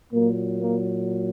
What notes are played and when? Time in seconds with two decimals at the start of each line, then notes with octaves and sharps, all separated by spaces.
0.13 A#2 F#3 A#3
0.61 A#3